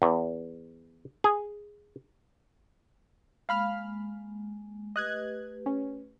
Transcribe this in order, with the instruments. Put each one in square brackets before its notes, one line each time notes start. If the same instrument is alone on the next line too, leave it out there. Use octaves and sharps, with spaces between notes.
[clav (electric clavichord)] E2
G#4
[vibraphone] G#3 A#3 [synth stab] F5 B5 F6
[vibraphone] A3 G4 B4 [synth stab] D#5 F#6 G#6
[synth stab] C#4